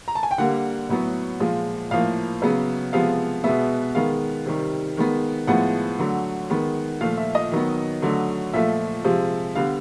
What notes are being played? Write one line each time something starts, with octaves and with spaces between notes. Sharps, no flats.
A#5
A5
G#5
G5
D3 G3 A#3 F#5
A2 F#3 B3
A#2 F3 G#3
A2 F3 A#3 F5
C#3 F#3 B3
C3 F3 G#3 B3 F5
B2 G#3 B3 E5
D#3 G#3 B3 F5
C3 D#3 G3
D#3 G#3 B3
A2 F3 G#3 B3 F#5
D3 F#3 A3
D#3 G#3 B3
A#2 F3 A3 F5
E5
D#5
D#3 F#3 B3
D3 F#3 A3
A#2 F3 A3 E5
C3 F3 G#3
D3 G3 B3 F5